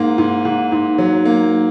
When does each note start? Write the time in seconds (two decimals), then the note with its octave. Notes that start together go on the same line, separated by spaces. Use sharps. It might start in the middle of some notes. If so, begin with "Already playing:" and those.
Already playing: G#2 A#3
0.18 G#2
0.45 G#2
0.72 G#2
0.98 F#3
1.25 A#3